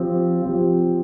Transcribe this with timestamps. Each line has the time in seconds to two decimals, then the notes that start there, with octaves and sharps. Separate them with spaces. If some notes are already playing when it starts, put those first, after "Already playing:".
Already playing: F3 C4 G4
0.42 F3 C4 G4